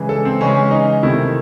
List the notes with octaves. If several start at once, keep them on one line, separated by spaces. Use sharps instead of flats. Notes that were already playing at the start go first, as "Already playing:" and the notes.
Already playing: C#3 E3 G#3
A4
C4
C#3 E3 G#3 C#4
D#4
C3 D#3 A3 E4